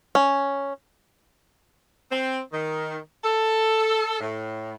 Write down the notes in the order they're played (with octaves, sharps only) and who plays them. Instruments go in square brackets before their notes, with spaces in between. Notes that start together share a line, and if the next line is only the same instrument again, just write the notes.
[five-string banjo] C#4
[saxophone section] C4
D#3
A4
A2